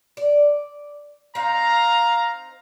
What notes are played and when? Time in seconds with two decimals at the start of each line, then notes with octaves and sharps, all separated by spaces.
0.17 D5
1.35 C4 D#4 F5 A#5